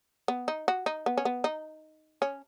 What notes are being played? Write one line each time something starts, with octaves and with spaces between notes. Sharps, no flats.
B3
D#4
F#4
D#4
B3
C#4
B3
D#4
C#4